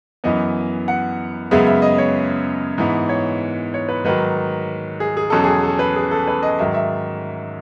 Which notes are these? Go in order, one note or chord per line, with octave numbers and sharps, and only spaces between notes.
F#2 E3 B3 D#5
F#5
F#2 C#3 G#3 B3 E5
E5
D#5
C#5
G#2 E3 B3
C#5
C#5
B4
G#2 D#3 F#3 B4
G#4
G#4
E2 B2 F#3 C#4 A4
G#4
A4
B4
G#4
A4
B4
D#5
G#2 D#3 F#3 E5
E5